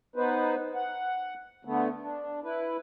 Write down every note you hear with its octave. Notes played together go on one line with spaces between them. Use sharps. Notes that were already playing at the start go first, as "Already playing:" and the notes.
B3 D#4 B4 C5
F#5
D3 A3 B3
D4
E4 B4